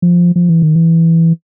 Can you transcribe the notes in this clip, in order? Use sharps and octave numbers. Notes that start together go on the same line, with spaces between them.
F3
F3
E3
D#3
E3